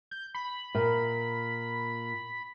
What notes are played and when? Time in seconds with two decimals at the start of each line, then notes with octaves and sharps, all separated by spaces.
0.11 G6
0.35 B5
0.75 A#2